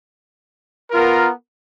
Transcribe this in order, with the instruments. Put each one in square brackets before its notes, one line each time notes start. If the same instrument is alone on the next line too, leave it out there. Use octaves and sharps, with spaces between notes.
[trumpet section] B3 F4 A#4